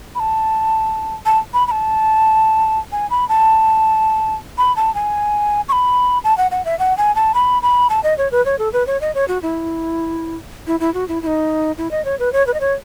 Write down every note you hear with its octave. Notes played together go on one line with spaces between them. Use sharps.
B5
A5
A5
B5
B5
A5
G#5
B5
A5
B5
A5
G#5
C#6
B5
A5
F#5
F#5
E5
F#5
G#5
A5
B5
B5
A5
D#5
C#5
B4
C#5
A4
B4
C#5
D#5
C#5
F#4
E4
E4
E4
F#4
E4
E4
D#4
E4
D#5
C#5
B4
C#5
B4
D#5
C#5